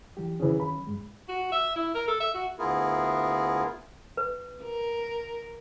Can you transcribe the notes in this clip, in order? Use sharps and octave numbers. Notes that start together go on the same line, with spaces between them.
E3 F#3 G4
D#3 E3 F#3 C#4 G#4
B5
G2 G#3
F#4
E5
E4
A#4
A4
E5
F#4
D2 B3 E4 F4 G#4 A#4
B4
A#4